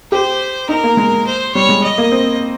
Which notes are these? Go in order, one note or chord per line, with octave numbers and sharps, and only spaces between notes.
G4 C5
D#4 A#4
A#3
G#3
C5
G3 C#5
G#3
D#5
A#3
C4